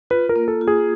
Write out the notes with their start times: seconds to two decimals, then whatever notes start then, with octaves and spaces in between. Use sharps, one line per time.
0.10 F4 B4
0.29 A#4
0.36 A#3
0.48 A4
0.61 F4
0.68 G#4